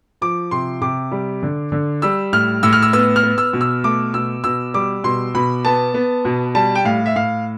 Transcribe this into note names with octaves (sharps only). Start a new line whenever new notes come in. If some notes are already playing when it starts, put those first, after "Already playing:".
F3 D6
C3 C6
C3 D6
G3
D3
D3
G3 E6
A2 F6
A2 E6
F6
E6
B3 E6
F6
B3
E6
B2
E6
A3 D6
B2 E6
B2 E6
G3 D6
B2 C6
B2 B5
B3 A5
B3
B2
G3 A5
G5
A2 F5
E5
A2 F5